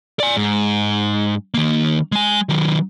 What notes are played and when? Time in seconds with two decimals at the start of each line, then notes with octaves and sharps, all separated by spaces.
0.20 D5 G#5
0.37 G#2
1.54 D#3 A#3
2.12 G#3 G#5
2.49 D#3 F#3